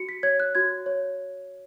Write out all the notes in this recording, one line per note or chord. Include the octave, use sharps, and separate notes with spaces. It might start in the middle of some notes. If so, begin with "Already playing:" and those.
Already playing: F#4 C#7
B6
C#5 G#6
F#6
F#4 G#6
C#5